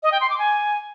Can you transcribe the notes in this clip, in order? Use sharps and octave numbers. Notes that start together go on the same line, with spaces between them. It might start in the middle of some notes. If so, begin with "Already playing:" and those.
D#5
G5
C6
D6
G#5